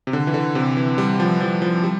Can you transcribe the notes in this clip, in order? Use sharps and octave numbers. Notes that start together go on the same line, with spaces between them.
C3
D3
E3
D3
C3
E3
G3
F3
F3
F3
G3